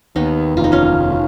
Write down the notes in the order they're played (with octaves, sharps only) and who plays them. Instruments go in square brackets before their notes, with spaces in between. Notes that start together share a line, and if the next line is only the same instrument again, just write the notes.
[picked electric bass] D#2 [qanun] B3 D#4
[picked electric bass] F1 [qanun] F4
[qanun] D#4
C#4 F4
[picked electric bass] F1